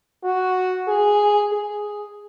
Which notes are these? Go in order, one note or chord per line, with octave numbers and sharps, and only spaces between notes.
F#4
G#4
G#4